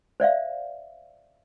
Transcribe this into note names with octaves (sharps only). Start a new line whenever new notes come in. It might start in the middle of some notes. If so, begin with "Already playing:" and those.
C5 D5 E5 F5